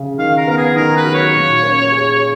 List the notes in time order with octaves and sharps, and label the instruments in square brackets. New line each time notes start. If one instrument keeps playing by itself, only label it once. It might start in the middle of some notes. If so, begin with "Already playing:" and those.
Already playing: [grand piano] C#3
[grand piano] D#3 [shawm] F5
[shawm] A#4
[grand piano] B3 [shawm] A#4
[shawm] G#4
[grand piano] D#3 [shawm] A#4
[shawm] B4
[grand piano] F#3
[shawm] C#5
[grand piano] A#2
C#4
G#4